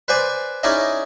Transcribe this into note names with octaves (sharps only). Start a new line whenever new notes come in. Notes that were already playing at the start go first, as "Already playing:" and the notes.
B4 C5 D5 G#5
C#4 D#4 E4 G#4 D5 D#5